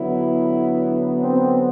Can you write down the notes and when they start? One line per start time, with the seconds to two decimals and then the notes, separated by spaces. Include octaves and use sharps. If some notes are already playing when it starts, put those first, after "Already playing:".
Already playing: D3 F#3 B3 E4
1.19 C4